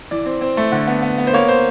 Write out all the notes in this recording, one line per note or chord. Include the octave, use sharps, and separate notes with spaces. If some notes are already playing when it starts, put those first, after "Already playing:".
E3 D5
C4
C4
A3
D3
B3
B3
B3
C5
A#3 C#5
C5